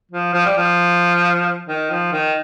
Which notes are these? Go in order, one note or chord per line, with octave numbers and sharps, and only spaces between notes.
F3
F3
G3
F3
D#3
F3
D#3